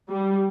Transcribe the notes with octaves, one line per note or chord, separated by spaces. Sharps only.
G3